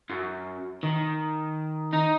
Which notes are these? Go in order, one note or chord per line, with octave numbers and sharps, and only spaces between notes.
F#2
D#3
D#4